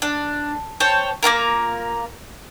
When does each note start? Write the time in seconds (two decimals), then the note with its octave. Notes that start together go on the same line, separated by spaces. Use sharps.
0.02 D4
0.80 C5 C#5 G5 A5
1.23 A#3 C4 F4 A#4